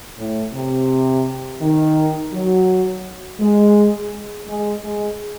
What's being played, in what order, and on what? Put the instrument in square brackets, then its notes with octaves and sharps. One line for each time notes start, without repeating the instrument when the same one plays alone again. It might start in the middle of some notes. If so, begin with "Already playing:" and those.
[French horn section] A2
C3
D#3
F#3
G#3
G#3
G#3